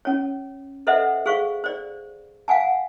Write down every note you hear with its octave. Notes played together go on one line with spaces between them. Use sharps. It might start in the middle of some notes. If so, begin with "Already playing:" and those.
C#4 C#5
A4 B4 C5 D#5 E5 F#5
G#4 C5 F5 C#6
C5 D5
F5 F#5 G#5 A5